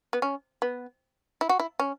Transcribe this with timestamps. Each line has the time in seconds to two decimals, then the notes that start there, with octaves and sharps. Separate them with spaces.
0.13 B3
0.22 C#4
0.62 B3
1.41 E4
1.49 F#4
1.60 E4
1.80 C#4